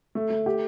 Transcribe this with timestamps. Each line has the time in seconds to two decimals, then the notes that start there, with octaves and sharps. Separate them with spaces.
0.15 A3
0.30 A3
0.46 G4